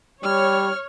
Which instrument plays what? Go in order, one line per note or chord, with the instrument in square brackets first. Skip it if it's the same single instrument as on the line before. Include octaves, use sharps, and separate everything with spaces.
[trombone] G3 [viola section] C#5 [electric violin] F6